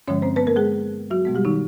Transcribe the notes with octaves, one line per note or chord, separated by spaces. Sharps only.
G2 D3 F3 G#3 C#4 C#5
C4 C5
B3 B4
A#3 A#4
G#3 G#4
F#3 F#4
B2 G#3 B3
G3 G4
D#3 D#4